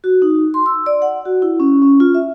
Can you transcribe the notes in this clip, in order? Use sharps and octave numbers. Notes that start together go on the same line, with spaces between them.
F#4
D#4
C6
E6
D5
F#5
F#4
E4
C#4
C#4
F4
E5